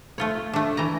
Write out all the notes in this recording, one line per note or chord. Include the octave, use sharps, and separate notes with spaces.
A3 F4 C#5
A3 D4
E3 A#5